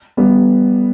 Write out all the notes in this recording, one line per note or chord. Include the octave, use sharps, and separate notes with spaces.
G3 B3